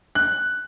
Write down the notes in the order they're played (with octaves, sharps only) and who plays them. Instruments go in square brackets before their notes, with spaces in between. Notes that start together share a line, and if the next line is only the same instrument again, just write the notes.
[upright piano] F#6